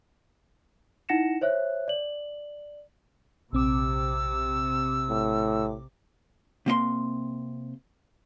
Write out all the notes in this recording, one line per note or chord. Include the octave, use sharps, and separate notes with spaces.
D#4 E4 F#5 A#6 C#7 E7
C5 C#5 E5 F#6
D5 F#7
A#1 C3 C4 D6 E6
A2
C3 A#3 D5 C6